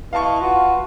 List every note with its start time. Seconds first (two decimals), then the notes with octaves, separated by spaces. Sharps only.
0.13 E4 B4 D#5 F5 A5 C#6
0.41 F4 F#4 B4